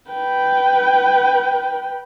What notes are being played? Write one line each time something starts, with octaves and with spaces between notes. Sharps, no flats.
B4 G5